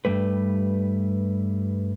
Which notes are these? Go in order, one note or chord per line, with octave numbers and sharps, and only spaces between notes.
G2 A#2 G3 A3 B4